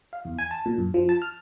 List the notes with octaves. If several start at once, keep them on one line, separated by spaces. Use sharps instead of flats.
F5
E2
G#5
A5
A#2
F#2
F3
A5
F6